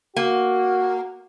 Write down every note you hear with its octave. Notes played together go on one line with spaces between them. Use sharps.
A#3 F#4